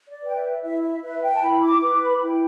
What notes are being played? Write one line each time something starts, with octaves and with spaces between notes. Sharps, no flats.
D5
B4 G5
E5
E4 E5
E5
B4 E5
G5
A5
E4 B5
D6
B4 D6
B5
E4 G5